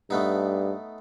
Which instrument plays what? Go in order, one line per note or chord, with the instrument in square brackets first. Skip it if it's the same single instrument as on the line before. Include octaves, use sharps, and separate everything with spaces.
[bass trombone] G2 [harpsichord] A3 B3 D#4